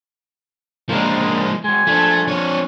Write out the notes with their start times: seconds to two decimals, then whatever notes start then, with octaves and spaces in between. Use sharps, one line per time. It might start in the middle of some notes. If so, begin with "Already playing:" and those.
0.89 F3 G#3 A#3 D4 A#4
1.64 G#3 F#4 G#5
1.87 F3 A3 D4 A4
2.28 C4 C#5